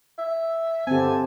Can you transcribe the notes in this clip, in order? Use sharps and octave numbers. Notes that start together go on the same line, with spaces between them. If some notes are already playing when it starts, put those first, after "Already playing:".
E5
G2 D3 C4 G4 G#5 A5